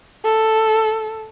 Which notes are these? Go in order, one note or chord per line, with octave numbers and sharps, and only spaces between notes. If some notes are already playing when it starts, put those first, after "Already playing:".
A4